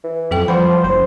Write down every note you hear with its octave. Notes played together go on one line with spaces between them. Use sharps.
E3
F2 F#3 A4 G5
F3 G3 C5 F#5 B5
F#1 C5